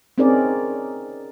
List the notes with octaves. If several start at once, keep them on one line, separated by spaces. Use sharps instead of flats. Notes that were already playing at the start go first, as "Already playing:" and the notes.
C4 C#4 D#4 G#4 A#4 D5